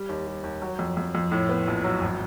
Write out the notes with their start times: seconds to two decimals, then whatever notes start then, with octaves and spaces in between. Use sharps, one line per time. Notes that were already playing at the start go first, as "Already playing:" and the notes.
Already playing: G3
0.09 D#2
0.27 G3
0.43 D#2
0.62 F#3
0.79 F2
0.97 F2
1.15 F2
1.31 A2
1.49 B3
1.67 A#1
1.84 F#3
2.01 G#1